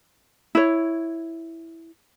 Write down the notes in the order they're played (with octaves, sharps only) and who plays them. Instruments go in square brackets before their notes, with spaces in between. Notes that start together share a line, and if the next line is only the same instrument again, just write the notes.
[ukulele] E4 C#5